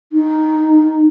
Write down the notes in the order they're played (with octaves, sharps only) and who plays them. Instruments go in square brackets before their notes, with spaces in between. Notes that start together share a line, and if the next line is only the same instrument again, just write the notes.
[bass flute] D#4